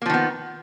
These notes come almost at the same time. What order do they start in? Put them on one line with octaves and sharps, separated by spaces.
A#3 F3 D#3 B3